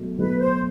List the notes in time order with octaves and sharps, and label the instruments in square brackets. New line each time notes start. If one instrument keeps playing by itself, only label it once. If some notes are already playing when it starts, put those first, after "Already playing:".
Already playing: [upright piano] B2 F#3 A3
[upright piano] B2 F#3 A3 [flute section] B4
[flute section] C5